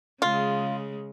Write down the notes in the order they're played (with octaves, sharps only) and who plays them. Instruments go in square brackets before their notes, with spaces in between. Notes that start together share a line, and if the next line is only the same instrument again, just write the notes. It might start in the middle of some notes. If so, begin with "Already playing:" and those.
[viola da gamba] C#3 G#3 [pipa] F4